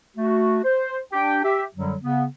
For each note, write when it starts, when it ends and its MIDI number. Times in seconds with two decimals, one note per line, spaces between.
0.17 0.60 57
0.17 0.60 66
0.64 0.99 72
1.13 1.40 62
1.13 1.40 67
1.13 1.40 79
1.44 1.64 67
1.44 1.64 76
1.75 1.95 42
1.75 1.95 50
1.75 1.95 54
1.75 1.95 55
2.02 2.25 49
2.02 2.25 59